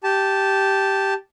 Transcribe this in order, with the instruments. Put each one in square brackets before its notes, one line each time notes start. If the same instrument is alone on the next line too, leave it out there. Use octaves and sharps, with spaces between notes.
[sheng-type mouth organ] G4 A5